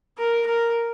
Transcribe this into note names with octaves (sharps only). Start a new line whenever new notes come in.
A#4
A#4